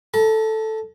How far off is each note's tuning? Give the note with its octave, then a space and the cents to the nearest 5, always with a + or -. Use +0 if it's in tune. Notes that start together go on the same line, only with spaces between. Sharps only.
A4 +0 A#5 +40